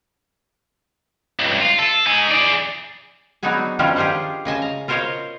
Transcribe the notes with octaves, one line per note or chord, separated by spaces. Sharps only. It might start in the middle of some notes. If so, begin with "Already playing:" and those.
C#2 G2
F4
A4
D#4 G#5
G#4 D5
F#3 B3 D4 D#4 F#4 G#4
D#3 F3 G3 C#4 D4 F4
F4 G4 G#4 C5 F#5
C#3 D#5 G#5 A5
A#5
F4 A#4 C5 C#5 D#5 F5